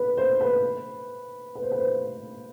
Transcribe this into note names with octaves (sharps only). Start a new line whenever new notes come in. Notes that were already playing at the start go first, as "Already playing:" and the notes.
Already playing: B4
C5
B4
B4
C5
B4
C5